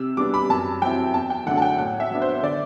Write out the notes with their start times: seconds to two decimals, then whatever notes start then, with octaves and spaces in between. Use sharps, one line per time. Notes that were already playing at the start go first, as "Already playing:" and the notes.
Already playing: C3 E6
0.17 G3 B3 D4 D6
0.34 B5
0.50 F#2 A5
0.82 F#3 C4 E4 G5
1.14 E2 A5
1.30 G5
1.46 D3 F#3 A3 D4 F#5
1.57 A5
1.62 G5
1.78 A2 F#5
2.00 E5
2.11 F#3 B3 D4
2.22 C5
2.43 D3 D5